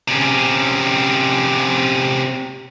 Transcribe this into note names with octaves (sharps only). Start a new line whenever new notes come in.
C3 C#4